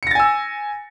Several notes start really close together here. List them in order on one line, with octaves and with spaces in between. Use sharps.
C#7 A#6 A6 G#5 E6